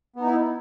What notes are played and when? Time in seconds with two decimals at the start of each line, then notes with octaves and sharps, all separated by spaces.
0.16 B3
0.21 D#4
0.25 E4